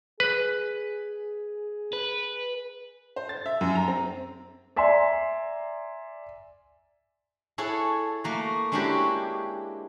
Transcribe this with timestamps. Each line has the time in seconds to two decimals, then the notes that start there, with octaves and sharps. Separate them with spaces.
0.20 G#4 B4
1.93 B4
3.16 C5
3.29 A6
3.46 E5
3.61 F#2
3.75 A#5
3.88 C4
4.76 D5 E5 G#5 A#5 C6
7.58 E4 G#4 A4 C#5 F#5
8.24 A3 A#3 F#4
8.72 G#3 C#4 D4 E4 F#4 G4